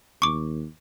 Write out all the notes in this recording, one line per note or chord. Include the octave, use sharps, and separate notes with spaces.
D#2 C#6 D6